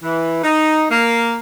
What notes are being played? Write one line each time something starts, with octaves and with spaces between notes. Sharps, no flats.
E3
D#4
A#3